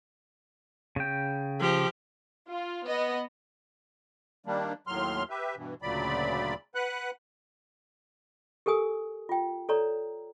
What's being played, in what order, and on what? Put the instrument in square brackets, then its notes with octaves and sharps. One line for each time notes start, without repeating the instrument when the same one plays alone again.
[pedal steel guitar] C#3 G5
[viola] F3 G4
[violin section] F4
B3 D#5
[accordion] D#3 G3 A#3 D4
D#2 A2 F#3 C6 F6
G4 B4 E5
G2 B2 E3
D2 A#2 C#3 F#3 D5 B5
B4 F#5 F#6
[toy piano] G4 A4 A#4 G#5 D#6
F4 G5
A4 C#5 D5 A#5